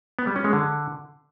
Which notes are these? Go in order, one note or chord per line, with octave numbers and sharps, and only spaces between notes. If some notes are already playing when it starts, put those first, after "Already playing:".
B3
G3
C#4
G#3
D3